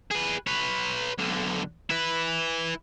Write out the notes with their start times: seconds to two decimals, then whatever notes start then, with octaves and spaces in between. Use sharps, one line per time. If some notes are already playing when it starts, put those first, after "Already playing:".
0.11 G#4 B4
0.47 B4 C#5
1.19 B1 D3
1.90 E4 B4